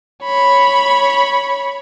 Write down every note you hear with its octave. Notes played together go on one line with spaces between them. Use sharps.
C#5 B5